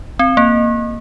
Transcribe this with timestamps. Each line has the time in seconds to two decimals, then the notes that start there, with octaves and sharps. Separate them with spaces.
0.19 C4
0.37 A#3